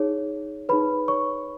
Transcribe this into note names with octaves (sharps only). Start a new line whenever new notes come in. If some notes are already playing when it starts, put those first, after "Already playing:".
Already playing: D#4 G#4 C#5
D#4 G#4 B4 C#5 B5
C#5 C#6